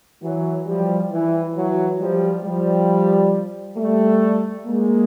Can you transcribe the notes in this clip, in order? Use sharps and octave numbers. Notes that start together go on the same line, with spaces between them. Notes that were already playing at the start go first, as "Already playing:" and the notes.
E3 F#3
F3 G3
E3
E3 F#3
F3 G3
F3 G3
G3 A3
G#3 A#3